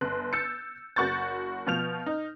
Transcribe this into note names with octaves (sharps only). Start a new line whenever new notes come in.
G1 C6 F#6
E6 G6 A6 C#7
F#1 F#4 C#6 G6 A6
B2 F3 F6 G6 F7
D#4